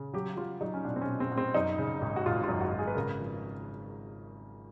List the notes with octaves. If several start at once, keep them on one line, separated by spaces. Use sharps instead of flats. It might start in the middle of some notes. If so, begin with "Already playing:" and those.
Already playing: C#3
F#3 G4
F#3 F4
F#3 D#4
C#4
B2 D4
C4
C#4
B2
C4
B2
C4
F#2 D#4
C#3
G#1
F#4
G#1 F4
F#2 F4
F#4
G#1
G#4
B4
C#3 A#4
F3